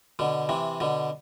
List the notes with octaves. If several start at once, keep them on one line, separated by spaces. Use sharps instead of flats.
B2 D3
C3 E3
B2 D3